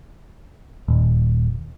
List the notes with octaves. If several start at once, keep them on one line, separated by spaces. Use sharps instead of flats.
D#1